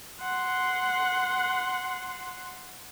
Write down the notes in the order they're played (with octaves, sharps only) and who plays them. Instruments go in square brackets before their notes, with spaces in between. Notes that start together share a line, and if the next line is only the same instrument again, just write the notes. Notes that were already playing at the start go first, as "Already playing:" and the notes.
[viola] F#5 C6